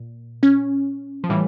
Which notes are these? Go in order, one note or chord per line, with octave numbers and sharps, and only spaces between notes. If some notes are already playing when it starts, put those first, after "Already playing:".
Already playing: A#2
C#4
F3
A2 E3 G3